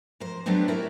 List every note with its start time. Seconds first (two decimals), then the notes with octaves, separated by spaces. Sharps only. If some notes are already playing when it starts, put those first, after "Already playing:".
0.20 F2 A#4 C5
0.46 F#3 G3 A3 B3 C4 D4
0.68 E4 A#4 C#5 D5 E5